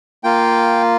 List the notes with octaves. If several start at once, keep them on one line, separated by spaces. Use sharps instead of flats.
A#3 F4 G5